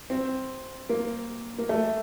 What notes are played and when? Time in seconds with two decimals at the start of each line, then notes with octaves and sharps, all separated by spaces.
0.10 C4
0.89 A#3
1.58 A#3
1.69 A3